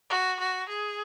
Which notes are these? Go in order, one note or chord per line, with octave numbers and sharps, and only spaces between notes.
F#4
F#4
G#4